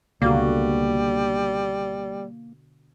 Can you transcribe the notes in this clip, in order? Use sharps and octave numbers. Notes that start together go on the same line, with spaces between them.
C#2 B2 D3 G3 A#3 F#4